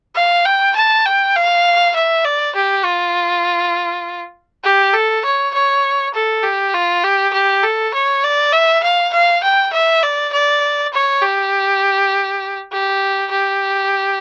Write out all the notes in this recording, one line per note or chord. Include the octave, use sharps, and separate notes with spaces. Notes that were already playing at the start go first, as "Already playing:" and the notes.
F5
G5
A5
G5
F5
E5
D5
G4
F4
G4
A4
C#5
C#5
A4
G4
F4
G4
G4
A4
C#5
D5
E5
F5
F5
G5
E5
D5
D5
C#5
G4
G4
G4